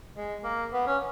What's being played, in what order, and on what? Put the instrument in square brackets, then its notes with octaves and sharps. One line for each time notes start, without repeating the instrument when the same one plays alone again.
[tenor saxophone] G#3
A#3
B3
C#4